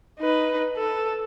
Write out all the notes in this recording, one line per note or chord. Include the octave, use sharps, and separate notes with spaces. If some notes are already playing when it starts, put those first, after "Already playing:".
D#4 B4
A4